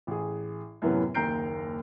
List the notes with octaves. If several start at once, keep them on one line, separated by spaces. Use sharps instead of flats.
A1 G#4
F#2 A2 C3 E3 B3 C#4
F#1 D#2 A#5 G6 C7 D7